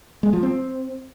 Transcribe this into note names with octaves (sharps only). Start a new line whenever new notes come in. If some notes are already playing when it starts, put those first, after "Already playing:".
G#3
F3
C4